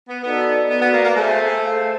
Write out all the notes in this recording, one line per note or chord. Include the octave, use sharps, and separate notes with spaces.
B3
B3 D#4 F#4 A4 D5
B3 F#4 B4 D5
B3
A#3
A#3
A3 G#4 C5 E5 G#5
A4 C5 F5